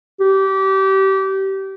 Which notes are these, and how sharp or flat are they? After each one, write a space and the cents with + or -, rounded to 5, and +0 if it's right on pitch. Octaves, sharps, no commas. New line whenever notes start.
G4 -25